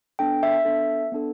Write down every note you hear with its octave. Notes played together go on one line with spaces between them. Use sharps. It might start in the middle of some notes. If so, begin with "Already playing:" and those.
B3 D4 A4 G5
E5
B3 D4 A4
B3 D4 A4